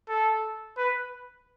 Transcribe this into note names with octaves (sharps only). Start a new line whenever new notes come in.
A4
B4